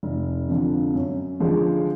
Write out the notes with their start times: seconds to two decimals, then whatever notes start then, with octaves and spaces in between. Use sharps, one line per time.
0.03 F1
0.48 F2 D3 F3
0.94 F#2
1.40 D3 F3 G#3